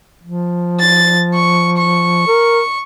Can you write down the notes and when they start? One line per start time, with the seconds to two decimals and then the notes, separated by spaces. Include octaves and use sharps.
0.23 F3
0.80 A6
1.34 C#6
1.77 C#6
2.27 A#4